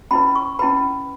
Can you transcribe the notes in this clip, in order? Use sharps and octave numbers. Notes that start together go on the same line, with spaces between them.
C#4 E4 B4 B5
C#6
C#4 E4 B4 B5